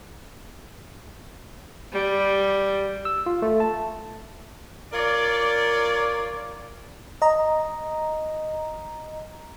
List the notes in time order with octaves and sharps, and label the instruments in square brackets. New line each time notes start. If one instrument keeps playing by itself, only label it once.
[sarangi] G3
[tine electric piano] E6
F4
A3
A5
[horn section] F4 A#4 C#5 D5
[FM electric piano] D#5 A#5